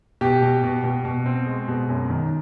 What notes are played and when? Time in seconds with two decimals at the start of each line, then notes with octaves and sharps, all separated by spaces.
0.21 B2 G4
0.42 B2
0.64 B2
0.84 B2
1.05 B2
1.26 C4
1.47 G#3
1.68 B2
1.89 F#2
2.10 D#3